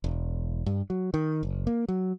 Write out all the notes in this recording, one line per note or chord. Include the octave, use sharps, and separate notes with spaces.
E1
G2
F#3
D#3
F#1
A#3
F#3